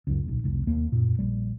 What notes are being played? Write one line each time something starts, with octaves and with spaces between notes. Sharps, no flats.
C#2 F#2
D#1 B1
F1 C2
D#2 A#3
F#2 A#2
A#1 G3